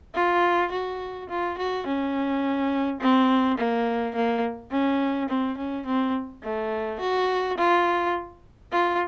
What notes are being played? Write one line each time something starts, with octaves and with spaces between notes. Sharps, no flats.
F4
F#4
F4
F#4
C#4
C4
A#3
A#3
C#4
C4
C#4
C4
A3
F#4
F4
F4